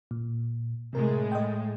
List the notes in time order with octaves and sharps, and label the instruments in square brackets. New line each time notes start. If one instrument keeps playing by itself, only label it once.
[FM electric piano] A#2
[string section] A2 G#3 [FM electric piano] C3 A#4
[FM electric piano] D#5 G5